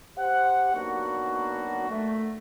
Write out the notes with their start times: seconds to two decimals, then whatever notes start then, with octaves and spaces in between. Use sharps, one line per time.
0.18 G4 C5 F#5
0.74 F#3 A#3 B3 D4 D#4 F#4
1.89 A3